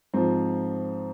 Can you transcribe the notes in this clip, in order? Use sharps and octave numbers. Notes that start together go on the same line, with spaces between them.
G#2 F3 C4